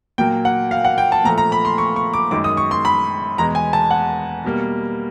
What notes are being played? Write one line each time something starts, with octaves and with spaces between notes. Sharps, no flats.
A#2 F#3 A#3 G5
F#5
F5
F#5
G5
A5
A#2 F3 A3 A#5
A#5
B5
C6
C#6
C#6
D6
F#2 D#3 G#3 D6
D#6
C#6
C6
B5
E2 B2 G#3 A#5
G#5
A5
F#5
B2 G3 A#3